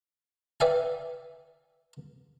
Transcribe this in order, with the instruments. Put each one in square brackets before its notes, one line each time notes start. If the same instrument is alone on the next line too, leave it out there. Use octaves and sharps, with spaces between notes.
[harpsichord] B4 D5 E5 F5 G5 G#5